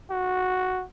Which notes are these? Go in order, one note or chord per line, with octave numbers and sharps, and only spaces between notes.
F#4